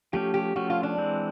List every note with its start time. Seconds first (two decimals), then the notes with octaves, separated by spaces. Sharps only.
0.13 F3 A3 C#4 G4
0.34 G4
0.56 F3 A3 C#4 F#4
0.70 F4
0.83 D4
0.98 E3 G#3 C4